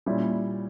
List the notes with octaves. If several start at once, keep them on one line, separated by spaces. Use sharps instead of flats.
A#2 G3 C#4 E4